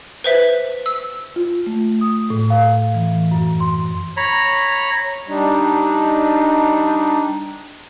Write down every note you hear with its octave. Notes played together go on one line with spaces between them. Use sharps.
B4 C5 E5
E6
F4
A3
D#6
A2
F5
E3
F#2
C6
C#5 A#5 B5
G3 D4 D#4